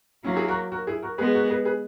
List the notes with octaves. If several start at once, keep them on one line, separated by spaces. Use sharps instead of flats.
F#3 A#3 C#4 E4
E4 G#4
F#4 A#4
F#4 A#4
E4 G#4
F#4 A#4
G#3 B3 G#4 B4
F#4 A#4
G#4 B4
G#4 B4